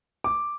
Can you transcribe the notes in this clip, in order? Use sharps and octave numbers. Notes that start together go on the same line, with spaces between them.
D6